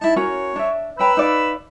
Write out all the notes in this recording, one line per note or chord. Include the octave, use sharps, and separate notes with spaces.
D#4 E4 A5
C#4 F#4 A#4 C#5
D4 E5
C#4 B4 G5 A#5 B5 E6
D#4 D5 F5